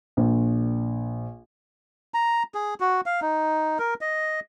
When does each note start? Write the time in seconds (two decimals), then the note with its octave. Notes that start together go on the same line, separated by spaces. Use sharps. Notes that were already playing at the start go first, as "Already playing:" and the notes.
0.17 A#1
2.14 A#5
2.54 G#4
2.80 F#4
3.06 F5
3.22 D#4
3.79 A#4
4.01 D#5